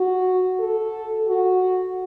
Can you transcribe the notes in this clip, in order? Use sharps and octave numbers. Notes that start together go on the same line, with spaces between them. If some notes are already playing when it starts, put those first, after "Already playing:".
Already playing: F#4
A4
F#4